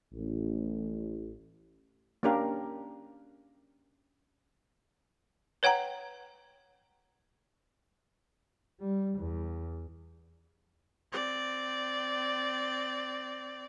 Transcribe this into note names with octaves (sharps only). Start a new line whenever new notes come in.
A1
A#3 C#4 D4 G4 A#4 F5
B4 C#5 F#5 G5 A#5
G3
E2
C4 D5